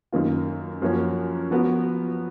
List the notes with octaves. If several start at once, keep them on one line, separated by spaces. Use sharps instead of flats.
F#2 D#3 A#3 F4
F#2 F3 A#3 C#4 F#4
F3 B3 F#4 A#4